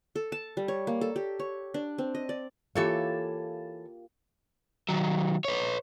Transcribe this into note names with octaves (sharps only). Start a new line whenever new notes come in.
A4
A5
G3
C#5
A#3
A4
G4
C#5
D4
C4
D#5
D5
E3 A#3 F4 G4 A4 C#5
D#3 F#3
B4 C#5